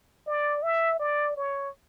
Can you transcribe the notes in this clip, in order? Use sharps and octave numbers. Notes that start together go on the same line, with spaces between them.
D5
E5
D5
C#5